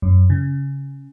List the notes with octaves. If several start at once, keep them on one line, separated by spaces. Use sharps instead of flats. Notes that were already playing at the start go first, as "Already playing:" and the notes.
F#2
C#3